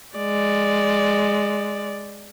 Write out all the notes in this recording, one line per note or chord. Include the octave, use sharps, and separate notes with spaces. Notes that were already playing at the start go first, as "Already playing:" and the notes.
G#3 D5